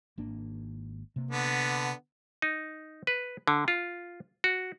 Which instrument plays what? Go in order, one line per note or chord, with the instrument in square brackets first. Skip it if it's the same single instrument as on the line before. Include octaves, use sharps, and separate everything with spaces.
[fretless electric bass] G#1 A#3 D4
C3 A#3
[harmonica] D3 B3
[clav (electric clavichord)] D#4
B4
D3
F4
F#4